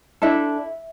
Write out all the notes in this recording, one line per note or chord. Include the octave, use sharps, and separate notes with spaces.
D4 E4 A4 E5